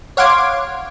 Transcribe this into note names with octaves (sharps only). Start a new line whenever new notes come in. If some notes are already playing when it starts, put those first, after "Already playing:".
C#5 F5 F#5 C6 D6 G#6